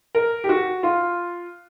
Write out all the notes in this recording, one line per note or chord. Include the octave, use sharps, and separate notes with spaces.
A#4
G4
F#4
F4